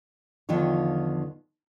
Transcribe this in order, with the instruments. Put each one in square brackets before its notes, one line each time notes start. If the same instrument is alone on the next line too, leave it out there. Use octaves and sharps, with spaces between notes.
[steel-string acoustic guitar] E2 D3 D#3 F3 F4 C#5